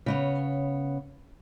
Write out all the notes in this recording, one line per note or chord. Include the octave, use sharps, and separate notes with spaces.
C#3 B3 C#5